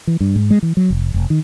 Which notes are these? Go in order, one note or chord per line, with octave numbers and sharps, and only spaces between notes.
E3
G2
G#2
G#3
E3
F#3
F1
F1
D#3